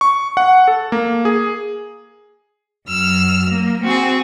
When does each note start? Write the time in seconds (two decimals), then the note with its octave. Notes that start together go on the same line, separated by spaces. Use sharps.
0.01 C#6
0.37 F#5
0.68 A4
0.92 A#3
1.25 G#4
2.87 F#2 E6 F6
3.51 A#3
3.84 C4 F#4 G#4